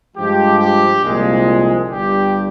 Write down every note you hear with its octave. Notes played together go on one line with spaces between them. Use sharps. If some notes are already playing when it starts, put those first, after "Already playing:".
G2 F3 G#3 G4
G4
C2 A#2 F3 G#3
G1 G2 G3 G4